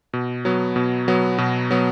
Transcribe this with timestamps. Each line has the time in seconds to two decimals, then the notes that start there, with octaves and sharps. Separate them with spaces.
0.13 B2
0.45 F#3 B3
0.76 B2
1.08 F#3 B3
1.38 B2
1.71 F#3 B3